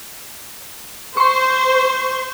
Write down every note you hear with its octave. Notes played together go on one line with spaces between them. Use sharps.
C5 C6 C#6